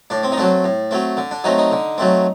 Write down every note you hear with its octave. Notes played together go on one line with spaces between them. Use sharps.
A2 D4
C4
D#4
F#3 A3 C4 D4
A2
F#3 A3 C4
D3
D4
F#3 A3 C4 D#4
D#4
D3
F#3 A3 C4